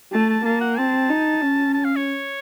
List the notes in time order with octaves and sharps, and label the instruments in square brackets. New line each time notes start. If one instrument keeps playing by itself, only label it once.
[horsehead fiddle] A3 [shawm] A5
[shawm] A5
[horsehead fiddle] A#3 [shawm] A5
[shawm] F#5
[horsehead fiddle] C4 [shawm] A5
[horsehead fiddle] D#4
C#4
[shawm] A5
F5
C#5